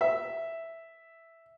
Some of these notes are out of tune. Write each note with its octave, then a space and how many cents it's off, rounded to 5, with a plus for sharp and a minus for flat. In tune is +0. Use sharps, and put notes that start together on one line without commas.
E5 +0